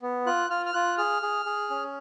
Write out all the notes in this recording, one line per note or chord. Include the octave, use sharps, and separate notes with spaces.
B3
F4 F#6
F4 F6
F6
F4 F#6
G#4 F6
G#4
G#4
C#4